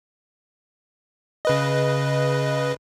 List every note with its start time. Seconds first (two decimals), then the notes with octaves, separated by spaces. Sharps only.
1.45 C#3 B4 D#5